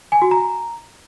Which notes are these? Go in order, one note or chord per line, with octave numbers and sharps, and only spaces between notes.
G#5
F#4
A#5